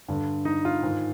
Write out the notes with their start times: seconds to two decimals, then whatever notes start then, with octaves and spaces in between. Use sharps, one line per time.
0.08 G2 D3
0.45 D#4
0.65 F4
0.83 G#2 D#3